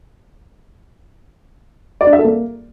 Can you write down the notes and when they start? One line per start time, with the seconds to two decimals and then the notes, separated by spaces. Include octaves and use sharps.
2.01 D5
2.07 D4
2.13 E5
2.19 A4
2.25 A#3